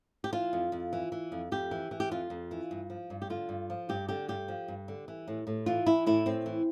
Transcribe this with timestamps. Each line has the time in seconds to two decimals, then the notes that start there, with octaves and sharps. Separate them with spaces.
0.24 G4
0.33 E3 F4
0.53 F2
0.72 F2
0.93 E3
1.12 E3
1.32 F2
1.52 F2 G4
1.71 E3
1.91 E3
2.00 G4
2.11 F2 F4
2.30 F2
2.51 E3
2.71 G2
2.90 F3
3.10 G2
3.22 G4
3.30 D3 F4
3.49 G2
3.70 F3
3.89 G2 G4
4.09 D3 G4
4.28 G2 G4
4.48 F3
4.68 G2
4.88 D3
5.08 E3
5.28 A2
5.47 A2
5.66 E3 F4
5.86 E3 E4
6.06 A2 E4
6.26 A2 C4
6.46 E3